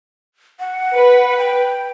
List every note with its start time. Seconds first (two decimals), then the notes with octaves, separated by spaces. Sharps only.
0.60 F#5
0.94 B4
1.38 G5